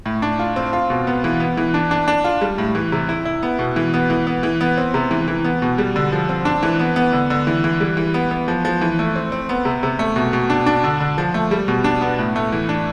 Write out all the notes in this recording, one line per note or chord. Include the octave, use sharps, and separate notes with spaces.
A2
D4
F4
C4
F4
B2
B3
E3
B3
E3
D4
D4
D4
F4
G3
A2
E3
C3
E4
E4
B3
B2
E3
B3
E3
B3
E3
B3
C4
C3
E3
E3
B3
B2
G3
D3
F3
C4
D4
E3
B3
B3
D3
D3
E3
E3
G3
E3
B3
B3
F3
F3
E3
A3
C4
C4
B3
C3
C3
A3
B2
B2
D4
D4
D3
D3
F3
A3
G3
B2
D4
B3
A2
A3
E3
D4